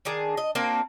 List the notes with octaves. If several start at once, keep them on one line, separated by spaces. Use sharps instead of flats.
D#3 D4 G#4
D#5
A#3 C4 D4 F#4